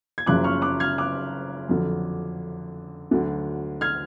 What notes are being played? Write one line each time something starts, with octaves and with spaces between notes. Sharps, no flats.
G#6
F#1 F#2 C#3 F3 D6 F#6
C#6 F6
D6 F#6
F6 G#6
D6 F#6
F2 D3 F#3
D2 D3 F#3
F6 G#6